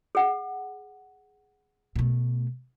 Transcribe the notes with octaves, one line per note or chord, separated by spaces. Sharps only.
G#4 F#5
B2 A3